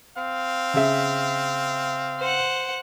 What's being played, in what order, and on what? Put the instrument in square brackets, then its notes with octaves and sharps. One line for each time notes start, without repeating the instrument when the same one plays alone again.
[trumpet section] C4 F5
[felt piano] C#3 G#4 E5
[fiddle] C5 F#5